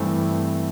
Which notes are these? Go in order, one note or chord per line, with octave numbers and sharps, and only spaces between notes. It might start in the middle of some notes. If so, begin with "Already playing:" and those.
Already playing: G2 E3 A3 C4